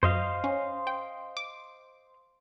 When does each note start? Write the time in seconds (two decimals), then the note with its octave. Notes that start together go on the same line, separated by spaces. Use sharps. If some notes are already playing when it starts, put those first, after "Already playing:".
0.03 F#2 C5 D#5 F5
0.44 C#4
0.87 G5
1.37 D6